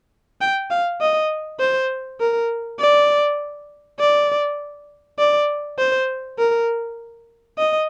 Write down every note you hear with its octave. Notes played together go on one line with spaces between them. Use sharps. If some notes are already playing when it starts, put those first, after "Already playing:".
G5
F5
D#5
C5
A#4
D5
D5
D5
C5
A#4
D#5